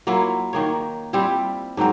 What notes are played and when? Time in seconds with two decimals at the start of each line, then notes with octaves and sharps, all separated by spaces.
0.07 F#3 A#3 E4 F4
0.53 D#3 A#3 C#5
1.13 G3 C4 E4 F4
1.77 G#2 F#3 C4 A#4